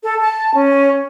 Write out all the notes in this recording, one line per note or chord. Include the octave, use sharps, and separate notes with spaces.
A4
A5
C#4